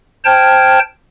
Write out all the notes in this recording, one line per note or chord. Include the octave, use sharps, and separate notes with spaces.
C5 G5 A5 F6 G#6